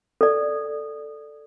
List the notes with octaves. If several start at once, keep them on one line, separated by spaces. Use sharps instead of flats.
A4 D5